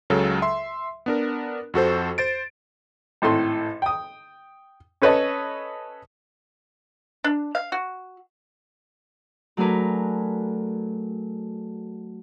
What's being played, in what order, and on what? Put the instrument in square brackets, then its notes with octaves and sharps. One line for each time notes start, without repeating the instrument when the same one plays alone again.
[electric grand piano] C#2 C#3 F#3 A4
E5 C6
B3 D4 A#4
F2 F#4 A4 C5
C5 A6 D7
[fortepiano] G#1 A2 A4 C6
G5 D#6
C#4 A4 B4 C#5 D#5 A5
[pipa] D4
F5
F#4
[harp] F#3 A3 D4 G#4 A#4 B4